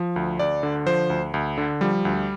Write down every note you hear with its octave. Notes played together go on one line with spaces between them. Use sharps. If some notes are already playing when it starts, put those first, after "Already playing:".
Already playing: F3
D2
D2 D5
D3
F3 C5
D2
D2
D3
F3 G3
D2